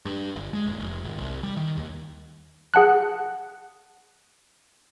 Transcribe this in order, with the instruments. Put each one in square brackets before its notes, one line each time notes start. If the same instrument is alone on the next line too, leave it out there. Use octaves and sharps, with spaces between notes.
[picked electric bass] G2
G1
G#3
D#1
F1
G#1
C2
G3
D#3
D#2
[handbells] G#4 F#5 A5 F#6